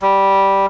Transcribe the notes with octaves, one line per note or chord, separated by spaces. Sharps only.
G3